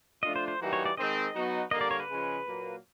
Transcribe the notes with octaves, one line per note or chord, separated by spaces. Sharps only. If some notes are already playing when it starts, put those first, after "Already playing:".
F3 A3 D4 F4 D#5
C5
C5
E3 G3 A#3 D#4 F#4
C#5
D5
D#3 G#3 C4 D#5
F#3 B3 D#4 F#4
D3 G3 A#3 D#5
D5
C#5
B4
C#3 F3 G#3 C#4
A#2 F#3 A#3